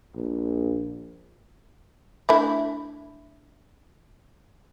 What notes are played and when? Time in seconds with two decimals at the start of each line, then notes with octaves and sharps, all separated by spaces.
0.16 A#1
2.29 A3 D4 E4